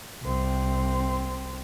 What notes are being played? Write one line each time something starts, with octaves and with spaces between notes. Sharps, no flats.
C2 C4